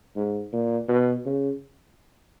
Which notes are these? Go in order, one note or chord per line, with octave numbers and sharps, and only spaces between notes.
G#2
A#2
B2
C#3